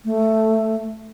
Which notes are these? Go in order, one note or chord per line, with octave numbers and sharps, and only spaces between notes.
A3